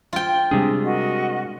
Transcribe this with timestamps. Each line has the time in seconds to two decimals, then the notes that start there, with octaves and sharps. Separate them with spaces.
0.13 F4 G5
0.51 C3 G3 G#3 D4 G#4
0.83 F#4 A#4 D#5